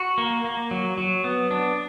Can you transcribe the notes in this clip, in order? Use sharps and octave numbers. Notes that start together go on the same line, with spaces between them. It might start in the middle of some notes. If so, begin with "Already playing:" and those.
Already playing: F#4
A#3
A#3
F#3
F#3
B3
D4